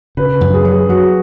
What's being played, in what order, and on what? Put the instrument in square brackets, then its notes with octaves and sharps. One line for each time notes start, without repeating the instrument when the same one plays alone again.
[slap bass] C#3 [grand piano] B4
[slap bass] F#2
[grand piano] G#4
[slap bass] F#3
[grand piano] G#4
[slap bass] F#3 [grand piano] F#4